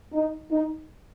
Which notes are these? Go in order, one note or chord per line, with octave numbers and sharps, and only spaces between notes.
D#4
D#4